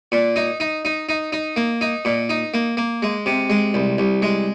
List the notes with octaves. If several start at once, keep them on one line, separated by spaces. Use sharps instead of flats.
A#2
D#4
D#4
D#4
D#4
D#4
A#3
D#4
A#2
D#4
A#3
A#3
G#3
C3
G#3
C2
C2
G#3